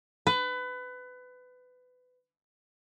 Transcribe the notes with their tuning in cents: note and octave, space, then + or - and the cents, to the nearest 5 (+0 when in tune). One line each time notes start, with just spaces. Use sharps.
B4 +25